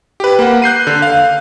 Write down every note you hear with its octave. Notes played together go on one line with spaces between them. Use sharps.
G4 B4
A#3 F#5
F#6 G6 C7 D#7
D3
F5